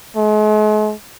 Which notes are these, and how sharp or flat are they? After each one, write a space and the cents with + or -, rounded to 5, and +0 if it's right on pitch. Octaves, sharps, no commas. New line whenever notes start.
G#3 +45